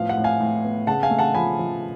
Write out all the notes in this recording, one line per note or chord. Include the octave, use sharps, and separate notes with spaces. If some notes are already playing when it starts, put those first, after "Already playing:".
Already playing: A2 F3 B3 F5
F#5
A2
F5 G#5
A2
B3
C#3 F#5 A5
F5 G#5
A3
F#5 A5
F3 G#5 B5
F3